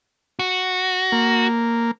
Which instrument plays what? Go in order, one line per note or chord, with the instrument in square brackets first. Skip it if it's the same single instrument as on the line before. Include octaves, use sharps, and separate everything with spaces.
[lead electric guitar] F#4
[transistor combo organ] A#3